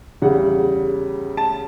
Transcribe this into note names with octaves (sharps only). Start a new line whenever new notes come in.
E2 C#3 G3 F#5
A5